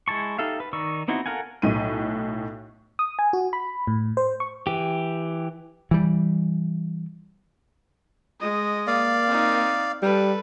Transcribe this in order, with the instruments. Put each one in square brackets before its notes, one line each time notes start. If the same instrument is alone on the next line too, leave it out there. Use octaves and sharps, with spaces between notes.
[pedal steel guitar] G#3 E4 A5 C#6
D#4 G4 A4 E5 F5
B4
D#3 D#4 D5 C#6 E6
B3 C4 D#4 E4 F#4
A4 A#4 F5 F#5 G#5
[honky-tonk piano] B1 A2 D#7
[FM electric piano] D#6
G#5
F#4
B5
A2
C5
C#6
[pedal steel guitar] E3 G4
[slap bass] E3 G3
[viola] G#3 D#5
[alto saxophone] A#3 [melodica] D5 F5
[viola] C4 D#4
[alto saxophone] G3 [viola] A4 B4